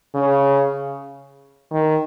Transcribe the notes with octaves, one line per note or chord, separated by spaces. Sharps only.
C#3
D#3